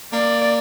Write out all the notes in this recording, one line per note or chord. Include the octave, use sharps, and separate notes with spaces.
A#3 D5